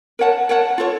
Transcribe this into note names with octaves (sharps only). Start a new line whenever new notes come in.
A#4 C#5 F#5 A5
A#4 C#5 F#5 A5
F4 A4 C#5